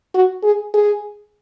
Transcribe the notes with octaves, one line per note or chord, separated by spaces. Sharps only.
F#4
G#4
G#4